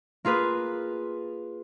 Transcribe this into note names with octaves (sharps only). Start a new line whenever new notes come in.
A#3 F4 G#4 B4